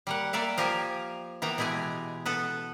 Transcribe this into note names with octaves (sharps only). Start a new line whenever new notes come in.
G3 A#3 F#5
G3 A#3 D5 E5 F5
F3 F4 G4 A#4 G#5
E3 A#3 B3 G5 A#5
B2 G#3 E4 G4 G#5
B3 A4 B4